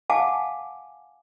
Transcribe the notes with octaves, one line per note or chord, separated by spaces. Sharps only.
F5 F#5 G#5 A5 D6